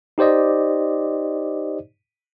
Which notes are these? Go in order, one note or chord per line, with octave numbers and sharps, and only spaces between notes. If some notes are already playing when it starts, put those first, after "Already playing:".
D#4 G4 C5 D5 D#5